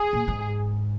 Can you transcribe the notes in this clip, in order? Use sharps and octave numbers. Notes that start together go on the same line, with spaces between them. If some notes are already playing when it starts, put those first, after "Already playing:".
Already playing: G#4
A#2
G#2